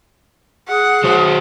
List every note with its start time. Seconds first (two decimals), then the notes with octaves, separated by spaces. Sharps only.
0.68 G#4 F#5
1.04 F#3 F#4 C5